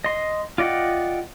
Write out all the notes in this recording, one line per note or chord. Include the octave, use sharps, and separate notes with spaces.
D#5 C6
F4 D5 D#5 F#5 G5